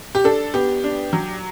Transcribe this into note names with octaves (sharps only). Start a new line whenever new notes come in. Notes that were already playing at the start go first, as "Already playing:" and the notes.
G4
D4 A4
B3 G4
D4
F#3